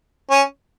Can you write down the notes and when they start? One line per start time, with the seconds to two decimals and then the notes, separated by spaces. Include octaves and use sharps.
0.30 C#4